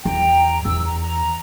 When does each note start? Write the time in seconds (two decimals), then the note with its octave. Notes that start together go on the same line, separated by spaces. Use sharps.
0.05 E2 G5 A#5
0.65 E2 E6
0.84 A#5
1.02 A#5